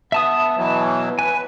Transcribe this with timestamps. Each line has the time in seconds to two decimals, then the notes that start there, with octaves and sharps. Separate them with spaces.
0.12 B3 E5 A5 D#6
0.57 B2 E3 F#3
1.19 B4 G#5